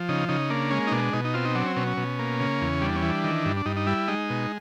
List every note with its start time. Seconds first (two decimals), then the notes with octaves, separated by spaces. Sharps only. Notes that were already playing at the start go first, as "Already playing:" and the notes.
Already playing: F3
0.09 C#3 D#4
0.29 C#3 D#4
0.50 A#3 D4
0.71 G#3 C#4
0.87 D#4
0.92 B2 D4
1.13 B2 D#4
1.24 D#4
1.34 C4 F4
1.45 D#4
1.55 F#3 D4
1.66 C#4
1.76 B2 C#4
1.87 C#4
1.97 B2
2.19 A#3
2.40 C#3
2.61 E2
2.81 G3 D4
2.96 C#4
3.02 E3
3.10 D4
3.24 D#3
3.45 G2
3.57 D4
3.66 G2 D#4
3.76 D#4
3.87 G3 E4
4.08 G#3 D#4
4.30 B2